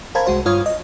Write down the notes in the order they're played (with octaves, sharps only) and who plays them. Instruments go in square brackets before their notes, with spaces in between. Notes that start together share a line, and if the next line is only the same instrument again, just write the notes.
[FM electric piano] A#4 C5 F5 A5 B5 G#6
C2 G#3 F#4 C5
G2 F4 C#5 D#6 F6 G#6
D#5